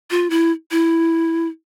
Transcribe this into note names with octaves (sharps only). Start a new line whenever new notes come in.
F4
E4
E4